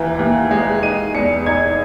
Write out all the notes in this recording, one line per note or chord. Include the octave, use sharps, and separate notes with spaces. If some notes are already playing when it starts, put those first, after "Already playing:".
Already playing: D#2 E3
D#2
G#3
D#4 D#7
E2 C#7
D#4 G#6